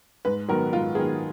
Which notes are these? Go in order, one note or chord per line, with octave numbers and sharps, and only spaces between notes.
G#2 B4
D#3 F#3 B3 A#4
G#2 F4
D#3 F#3 B3 G#4